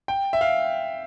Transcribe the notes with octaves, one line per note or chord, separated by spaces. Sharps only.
G5
E5
F5